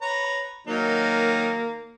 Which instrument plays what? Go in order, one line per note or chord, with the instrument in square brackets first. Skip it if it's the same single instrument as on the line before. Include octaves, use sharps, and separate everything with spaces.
[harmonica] B4 C#5 A#5
[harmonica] D#3 F#3 D#4 [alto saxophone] A#3